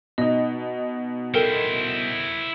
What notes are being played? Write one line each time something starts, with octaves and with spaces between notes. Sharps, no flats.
B2 D#4 D#5
E4 A4 A#4 C5 G5